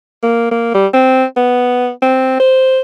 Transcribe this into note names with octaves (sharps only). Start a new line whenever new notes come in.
A#3
A#3
G3
C4
B3
C4
C5